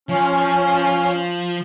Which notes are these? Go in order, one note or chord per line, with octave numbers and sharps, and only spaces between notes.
F3 C#4